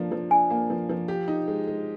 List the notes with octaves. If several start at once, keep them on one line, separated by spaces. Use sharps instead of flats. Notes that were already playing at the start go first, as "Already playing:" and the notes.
Already playing: F3 A#3 D4
F3
D4 G#5
A#3
F3
F3
G4
D#4
G#3
G#3